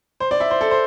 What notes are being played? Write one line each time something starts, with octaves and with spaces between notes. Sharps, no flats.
C5
D5
E5
C5
A4
C5